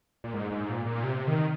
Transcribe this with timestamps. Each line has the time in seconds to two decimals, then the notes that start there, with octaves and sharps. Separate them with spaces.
0.24 A#2
0.34 G#2
0.51 G#2
0.69 A#2
0.86 A#2
1.04 C3
1.27 D#3